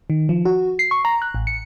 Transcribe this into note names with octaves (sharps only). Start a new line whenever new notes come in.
D#3
F3
F#4
C7
C#6
A#5
F#6
A1
C#7